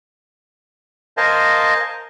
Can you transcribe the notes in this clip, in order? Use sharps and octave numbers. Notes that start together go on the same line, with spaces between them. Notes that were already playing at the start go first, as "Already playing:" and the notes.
A#4 C5 D#5 F5 G#5 A5